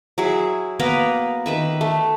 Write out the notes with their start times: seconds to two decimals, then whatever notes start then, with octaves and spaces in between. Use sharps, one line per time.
0.18 F#3 E4 G#4
0.80 A#3 B3 A#4 B4
1.46 D#3 B4 E5
1.81 A3